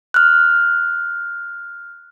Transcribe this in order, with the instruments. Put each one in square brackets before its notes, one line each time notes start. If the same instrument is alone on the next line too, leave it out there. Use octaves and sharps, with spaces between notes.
[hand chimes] F6 F#6